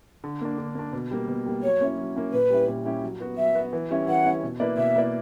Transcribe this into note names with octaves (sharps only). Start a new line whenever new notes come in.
D3
A#3 D4
D3
A#3 D4
B2
G3 A#3
B2
G3 A#3
F#3 C#5
A#3 C#4 E4
F#3
A#3 C#4 E4
A#2 B4
G3 C#4 E4 G4
A#2
G3 C#4 E4 G4
F#3
B3 F#4
F#3 E5
B3 F#4
E3
G3 C#4 E4
E3 F#5
G3 C#4 E4
B2
A#3 E4 B4 D5
B2 E5
A#3 E4 B4 D5